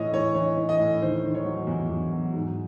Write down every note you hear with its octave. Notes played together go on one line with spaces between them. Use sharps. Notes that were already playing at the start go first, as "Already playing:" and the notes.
Already playing: A2 E3 C#5 D#5
E3 C#5
E3 C#5
E3
D#5
A2
D#3 C5
D#3
C#5
F#3
E2
E2
F#3
G#2